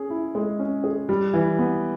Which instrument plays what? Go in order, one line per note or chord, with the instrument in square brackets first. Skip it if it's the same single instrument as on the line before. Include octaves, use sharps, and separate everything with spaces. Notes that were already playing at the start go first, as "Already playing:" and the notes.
Already playing: [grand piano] C#4 G#4
E4
G#3
C#4
G#4
G3
E3
B3